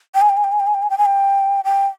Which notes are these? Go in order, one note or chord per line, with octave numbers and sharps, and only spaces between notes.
G5
G#5
G5
G#5
G5
G#5
G5
G#5
G5
G#5
G5
G#5
G5
G5